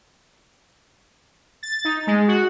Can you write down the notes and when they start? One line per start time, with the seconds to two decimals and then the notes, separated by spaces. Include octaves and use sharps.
1.63 A6
1.85 D#4
2.07 G#3
2.28 F#4